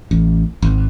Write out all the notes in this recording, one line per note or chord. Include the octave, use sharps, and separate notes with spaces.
A1
G#1